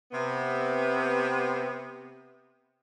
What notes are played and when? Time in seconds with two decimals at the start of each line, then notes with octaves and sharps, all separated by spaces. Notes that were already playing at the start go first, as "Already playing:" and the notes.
0.11 C3 B3